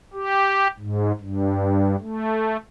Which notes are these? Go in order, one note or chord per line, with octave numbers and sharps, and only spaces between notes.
G4
G#2
G2
A3